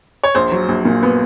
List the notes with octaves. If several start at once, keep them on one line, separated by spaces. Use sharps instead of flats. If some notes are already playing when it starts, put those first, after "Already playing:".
C#5
A#1 C5
F#3
A#1
A#2
B3